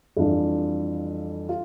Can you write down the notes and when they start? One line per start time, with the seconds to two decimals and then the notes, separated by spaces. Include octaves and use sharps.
0.17 F2 E3 G3 D4 F4
1.49 F4